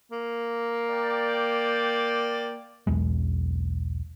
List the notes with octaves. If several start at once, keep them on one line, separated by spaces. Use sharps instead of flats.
A#3
D5 G5
B1 E2 G#3